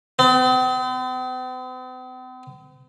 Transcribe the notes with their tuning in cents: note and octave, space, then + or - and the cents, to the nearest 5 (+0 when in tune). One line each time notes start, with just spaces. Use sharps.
C4 -45